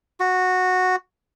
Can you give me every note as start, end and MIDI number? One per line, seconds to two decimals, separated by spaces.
0.20 0.96 66